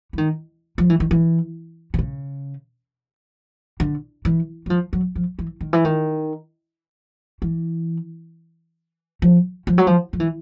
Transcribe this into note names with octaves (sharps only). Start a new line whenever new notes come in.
E3
D#3
F3
E3
D#3
E3
C3
C#3
D3
E3
F#3
F3
F#3
F3
E3
D#3
E3
D#3
E3
F3
F3
F#3
F3
F3
E3